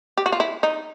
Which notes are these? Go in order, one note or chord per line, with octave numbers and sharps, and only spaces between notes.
G4
F#4
F4
E4
D#4